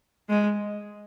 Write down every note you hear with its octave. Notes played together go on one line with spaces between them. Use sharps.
G#3